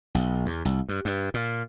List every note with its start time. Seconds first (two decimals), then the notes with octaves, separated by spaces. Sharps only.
0.15 B1
0.46 E2
0.65 C2
0.89 G2
1.05 G2
1.34 A#2